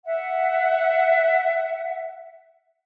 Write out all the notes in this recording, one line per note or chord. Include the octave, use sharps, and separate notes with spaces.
E5 F#5